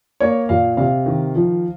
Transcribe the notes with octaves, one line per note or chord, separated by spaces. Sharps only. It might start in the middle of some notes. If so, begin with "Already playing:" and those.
A#3 C#5
A#2 F5
C3 F5
D#3
F3